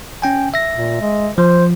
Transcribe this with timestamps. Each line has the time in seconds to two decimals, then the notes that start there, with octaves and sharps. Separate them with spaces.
0.22 C#4 G5 G#5
0.54 E5 A#6
0.74 A#2
1.01 G#3
1.38 F3 C5